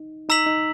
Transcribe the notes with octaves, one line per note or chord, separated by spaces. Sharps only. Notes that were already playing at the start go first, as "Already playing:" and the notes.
Already playing: D#4
D#4 A#5 E6 B6 F#7
D#4